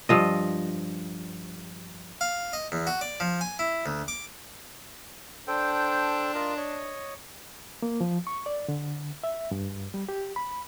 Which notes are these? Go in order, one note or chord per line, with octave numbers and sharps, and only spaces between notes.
G2 F3 D#5
F5
D#5
E2
F#4
D5
F3
G#5
E4
D2
D6
D4 A4 C5 G5
F4 A#4 D#5
C#5 D#5
A#3
F3
C#6
D5
D3
E5
G2
G3
G4
B5